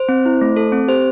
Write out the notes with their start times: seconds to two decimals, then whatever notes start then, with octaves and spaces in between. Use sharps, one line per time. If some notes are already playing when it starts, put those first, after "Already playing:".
Already playing: C5
0.09 C4
0.26 E4
0.41 A3
0.56 A4
0.72 C4
0.88 G4 C5